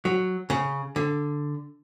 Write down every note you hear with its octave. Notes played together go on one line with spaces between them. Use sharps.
F#3
C#3
D3